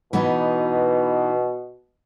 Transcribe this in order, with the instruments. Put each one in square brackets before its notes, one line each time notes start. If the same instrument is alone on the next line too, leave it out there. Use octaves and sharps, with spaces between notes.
[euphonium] B2 [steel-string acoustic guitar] E3 B3 D#4